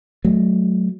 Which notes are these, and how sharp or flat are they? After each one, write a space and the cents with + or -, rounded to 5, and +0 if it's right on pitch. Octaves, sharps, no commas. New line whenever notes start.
F#3 +0 A3 -25